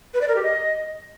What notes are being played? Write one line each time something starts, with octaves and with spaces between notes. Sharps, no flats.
B4
D5
A#4
G4
D#5